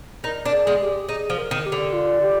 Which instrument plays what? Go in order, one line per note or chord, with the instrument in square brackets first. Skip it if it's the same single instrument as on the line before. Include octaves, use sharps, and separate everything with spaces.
[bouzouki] D#4 [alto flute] A#4
[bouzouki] D4
[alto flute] G#4
[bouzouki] G#3
[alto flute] G4
[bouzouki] D#4 [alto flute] G#4
[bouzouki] F3
[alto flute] A#4
[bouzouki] D#3
[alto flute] G4
[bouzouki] D3
[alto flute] F4
G4